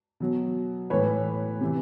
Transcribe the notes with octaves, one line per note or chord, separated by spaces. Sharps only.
B2 F#3
A2 E3 B4 C#5
C3 E3